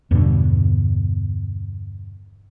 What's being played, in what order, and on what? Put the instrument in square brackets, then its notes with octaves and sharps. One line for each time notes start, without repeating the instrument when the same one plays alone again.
[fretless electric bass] E2 G2 B2 D3